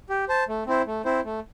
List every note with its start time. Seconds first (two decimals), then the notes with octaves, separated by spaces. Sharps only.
0.09 G4
0.29 C5 A5
0.48 A3
0.66 C4 E4 C5
0.87 A3
1.05 C4 E4 C5
1.24 A3